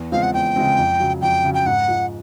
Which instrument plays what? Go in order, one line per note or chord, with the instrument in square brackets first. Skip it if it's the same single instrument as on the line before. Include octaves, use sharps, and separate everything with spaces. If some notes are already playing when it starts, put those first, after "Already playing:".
Already playing: [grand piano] E2
[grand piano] C#3 F3 G#3 C4 [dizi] F5
[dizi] F#5
[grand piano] E2 [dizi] G5
[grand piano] C#3 F3 G#3 C4
F2
C#3 F#3
[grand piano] F2 [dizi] G5
[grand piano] C#3 F#3
[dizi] G5
[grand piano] G#2 [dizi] F#5
[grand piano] F3 G#3